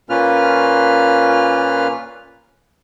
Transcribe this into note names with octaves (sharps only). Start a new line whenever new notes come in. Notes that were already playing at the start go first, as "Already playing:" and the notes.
A#2 A#3 C#4 F4 B4 F6